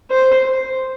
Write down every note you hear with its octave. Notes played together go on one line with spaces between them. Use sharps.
C5